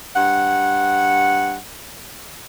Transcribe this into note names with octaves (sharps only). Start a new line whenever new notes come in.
G2 F#5